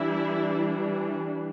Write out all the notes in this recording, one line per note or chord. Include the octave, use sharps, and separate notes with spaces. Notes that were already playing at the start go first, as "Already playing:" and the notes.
Already playing: E3 G3 D4 E4